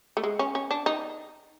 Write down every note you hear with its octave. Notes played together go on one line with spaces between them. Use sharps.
A3
G#3
C#4
C#4
D4
D#4